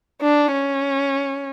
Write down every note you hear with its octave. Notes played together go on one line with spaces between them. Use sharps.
D4
C#4